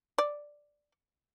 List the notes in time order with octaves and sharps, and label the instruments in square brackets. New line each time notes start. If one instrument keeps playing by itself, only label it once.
[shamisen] D5